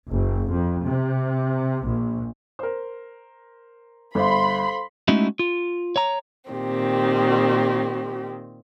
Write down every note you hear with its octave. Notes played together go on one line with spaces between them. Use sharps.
F#1
F2
C3
A#1
A#4 C5
G1 A4 C5 F5 B5 C6
G#3 A3 C#4 D#4 E4 F#4
F4
C#5 A#5
A#2 D#3 C4 G4